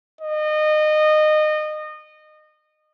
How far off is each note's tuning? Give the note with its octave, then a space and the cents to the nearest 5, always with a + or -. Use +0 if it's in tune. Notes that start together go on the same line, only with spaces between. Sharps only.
D#5 -25